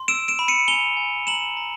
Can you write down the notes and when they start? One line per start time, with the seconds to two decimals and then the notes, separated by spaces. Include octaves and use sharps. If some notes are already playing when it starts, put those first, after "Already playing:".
Already playing: C6
0.08 E6 D7 E7
0.28 D7 E7
0.39 B5
0.48 C#7 D#7
0.68 G#5 F7 G7
0.97 G#5
1.27 A#5 E7 F#7
1.57 A#5